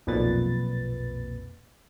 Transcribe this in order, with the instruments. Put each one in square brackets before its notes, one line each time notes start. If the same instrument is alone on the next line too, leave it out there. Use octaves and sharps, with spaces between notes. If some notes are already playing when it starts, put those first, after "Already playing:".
[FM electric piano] B1 F2 A#2 B4 A6